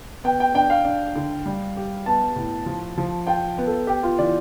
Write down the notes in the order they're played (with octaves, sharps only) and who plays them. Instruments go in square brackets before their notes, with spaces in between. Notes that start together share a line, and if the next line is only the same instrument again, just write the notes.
[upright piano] B3 [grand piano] G5
[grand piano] G5
[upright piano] D4 [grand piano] G5
[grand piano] F5
[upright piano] D4
D3
G3
G4
[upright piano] B3 [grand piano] A5
[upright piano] A2
F3
F3
[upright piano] F4 [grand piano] G5
[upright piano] B3
[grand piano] A4
[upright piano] B3 [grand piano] G4
[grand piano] F4
[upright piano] E3 [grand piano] D5